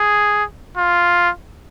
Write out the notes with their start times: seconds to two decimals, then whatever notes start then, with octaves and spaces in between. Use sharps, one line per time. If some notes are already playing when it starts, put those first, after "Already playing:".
Already playing: G#4
0.77 F4